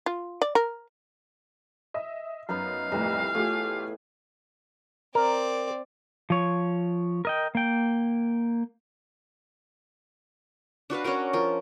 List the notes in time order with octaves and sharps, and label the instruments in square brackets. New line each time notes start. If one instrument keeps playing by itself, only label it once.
[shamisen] F4
D5
A#4
[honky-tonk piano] D#5 E5
[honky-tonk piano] F#2 [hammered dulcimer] B3 D#4 B4 [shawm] F5
[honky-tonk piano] C2 F2 A2 [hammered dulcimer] E3
[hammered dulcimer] A2 G#4 G#5 [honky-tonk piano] A3 F4 G4
[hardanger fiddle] C4 D5 [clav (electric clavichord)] A#4
[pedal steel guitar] F3 C#5
A#4 D#5 G5
A#3 G5
[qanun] D4 F#4 B4 F5
C#4 D4 F#4 A#4
F3 A#4